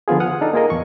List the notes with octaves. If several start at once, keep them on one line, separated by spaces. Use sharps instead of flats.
D3 F3 B3 F4 G#4
F#5 D#6 F6
D4 D#4 A4
A#3 F4 G#4 A#4 D#5
E2 C#6